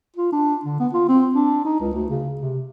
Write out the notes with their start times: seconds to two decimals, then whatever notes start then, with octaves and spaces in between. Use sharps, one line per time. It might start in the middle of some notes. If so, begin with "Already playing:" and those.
0.16 F4
0.32 D4
0.65 D3
0.80 B3
0.93 F4
1.08 C4
1.34 D4
1.65 D#4
1.79 C#2
1.94 D2
2.09 C#3
2.41 C3